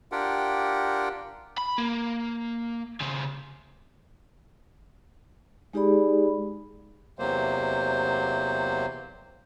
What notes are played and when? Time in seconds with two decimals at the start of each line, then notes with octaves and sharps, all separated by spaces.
0.12 D4 F4 G4 A#4 F#5 G5
1.58 B5
1.78 A#3
3.01 C#3 C4
5.73 G#3 D#4 G4 G#4 D5 B5
7.19 E2 C3 F#3 A#3 C5